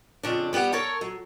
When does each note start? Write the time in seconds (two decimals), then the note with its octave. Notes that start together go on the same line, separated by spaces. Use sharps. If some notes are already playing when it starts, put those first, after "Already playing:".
0.23 F2 C#3 D4
0.53 G3 B3 G4 F#5
0.72 A4 A#4 C#5
1.01 F#3